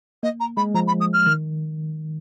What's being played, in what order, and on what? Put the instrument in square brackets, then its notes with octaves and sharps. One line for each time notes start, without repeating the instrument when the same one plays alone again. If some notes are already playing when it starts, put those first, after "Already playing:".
[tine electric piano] A#3 [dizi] D#5
[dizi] A#5
[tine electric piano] G#3 [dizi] B5
[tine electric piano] F3 [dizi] A#5
[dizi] B5
D#6
F6
[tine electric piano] D#3